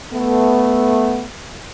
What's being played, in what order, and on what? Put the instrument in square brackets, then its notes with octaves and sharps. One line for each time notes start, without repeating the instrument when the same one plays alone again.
[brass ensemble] A3 B3